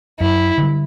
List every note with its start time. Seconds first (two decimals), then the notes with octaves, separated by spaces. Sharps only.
0.20 F#2 E4
0.58 D3 G3